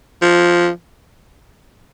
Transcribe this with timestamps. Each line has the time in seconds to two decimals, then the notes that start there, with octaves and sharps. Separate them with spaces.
0.22 F3